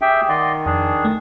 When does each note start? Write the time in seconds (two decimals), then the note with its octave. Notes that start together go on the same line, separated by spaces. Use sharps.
0.01 G4 G#4 E5 G5
0.29 D#3 D5 D#5 F#5 C6
0.66 F2 D4 G#4
1.05 A3